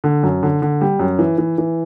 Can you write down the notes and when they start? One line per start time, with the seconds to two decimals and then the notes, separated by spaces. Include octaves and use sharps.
0.04 D3
0.23 F#2
0.43 D3
0.62 D3
0.81 G3
0.99 F#2
1.19 E3
1.38 E3
1.58 E3